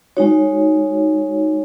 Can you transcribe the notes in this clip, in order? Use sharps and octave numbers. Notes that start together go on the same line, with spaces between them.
G#3 D#4 F#4 C#5